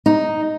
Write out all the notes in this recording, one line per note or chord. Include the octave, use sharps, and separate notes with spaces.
D#4